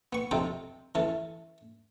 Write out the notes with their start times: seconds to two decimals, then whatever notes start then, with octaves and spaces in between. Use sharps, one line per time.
0.13 B3 C#6
0.31 B1 F2 C3 D#4 A4 G5
0.95 E3 C#4 A4